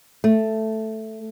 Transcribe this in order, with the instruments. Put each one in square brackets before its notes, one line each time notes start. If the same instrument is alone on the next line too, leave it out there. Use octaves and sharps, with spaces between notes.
[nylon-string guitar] A3